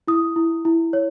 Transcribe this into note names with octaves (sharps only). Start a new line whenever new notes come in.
E4 D#6
E4
E4
C#5